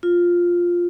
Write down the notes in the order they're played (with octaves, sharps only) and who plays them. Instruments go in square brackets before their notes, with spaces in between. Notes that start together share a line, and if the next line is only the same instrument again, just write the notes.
[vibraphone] F4